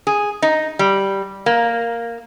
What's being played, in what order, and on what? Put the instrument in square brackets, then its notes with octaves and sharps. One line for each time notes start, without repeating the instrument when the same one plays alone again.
[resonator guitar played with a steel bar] G#4
D#4
G3
A#3